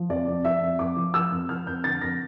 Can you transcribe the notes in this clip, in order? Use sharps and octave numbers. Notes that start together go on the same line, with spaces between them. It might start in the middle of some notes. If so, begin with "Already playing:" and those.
Already playing: F3
F2 D5
F2
F3 E5
F2
F2 D6
F3
F3 E6
F2
F3 F6
F2 G6
D3 A6
F2 A#6